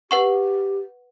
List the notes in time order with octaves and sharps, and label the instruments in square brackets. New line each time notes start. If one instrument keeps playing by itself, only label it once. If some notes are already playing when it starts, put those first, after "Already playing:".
[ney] G4 [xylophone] B4 F#5 C#6